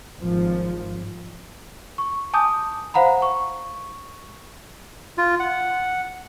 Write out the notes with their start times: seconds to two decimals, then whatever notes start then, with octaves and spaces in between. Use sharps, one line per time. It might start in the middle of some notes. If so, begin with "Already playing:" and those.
0.20 G#1 F3
1.98 C#6
2.34 G#5 A5 D6 D#6 G6
2.94 C5 F5 F#5 A#5 B5
3.22 C#6
5.18 F4
5.40 F#5